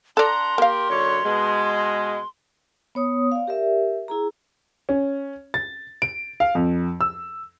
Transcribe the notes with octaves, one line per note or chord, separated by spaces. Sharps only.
D4 A4 D5 F#5 A#5 C6
A#3 G4 A#4 F5
F#2 D3 C#5
B2 G#3
B3 C#5 D#6
D5 F5
G4 A#4 D5 E5
E4 G#4 A#5
C#4
A6
D7
F5
F2
E6